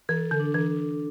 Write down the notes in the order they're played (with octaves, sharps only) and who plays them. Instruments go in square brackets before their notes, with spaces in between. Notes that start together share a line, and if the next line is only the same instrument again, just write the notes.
[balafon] E3 [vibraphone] A4
[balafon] D3
[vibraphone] D4
[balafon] E3